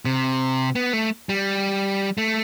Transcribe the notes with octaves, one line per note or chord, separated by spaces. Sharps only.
C3
B3
A3
G3
A3